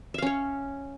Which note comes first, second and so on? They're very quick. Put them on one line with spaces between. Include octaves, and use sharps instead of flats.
E5 F5 C#4 C#5